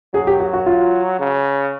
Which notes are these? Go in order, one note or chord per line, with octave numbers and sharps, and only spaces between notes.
F#3 G#4
G4
F#4
F#4
F4
C#3